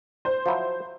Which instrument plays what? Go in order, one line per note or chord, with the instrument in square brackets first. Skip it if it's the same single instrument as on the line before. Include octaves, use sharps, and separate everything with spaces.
[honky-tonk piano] C5
[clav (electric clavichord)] F3 F#3 E4